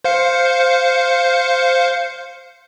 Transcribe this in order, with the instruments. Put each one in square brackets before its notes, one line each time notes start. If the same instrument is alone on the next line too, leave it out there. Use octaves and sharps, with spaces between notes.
[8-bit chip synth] C5 F5 C#7